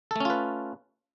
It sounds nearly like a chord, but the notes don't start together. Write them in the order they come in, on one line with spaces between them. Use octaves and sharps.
A4 A3 C#4 F4 B4